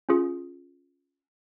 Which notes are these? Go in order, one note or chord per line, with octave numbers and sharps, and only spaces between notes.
C#4 F4 G#4